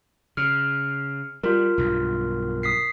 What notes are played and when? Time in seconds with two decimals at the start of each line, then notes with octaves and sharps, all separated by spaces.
0.37 C#3 F6
1.43 G3 F4 A#4
1.78 B1 G2 B2
2.63 D#6 B6 C7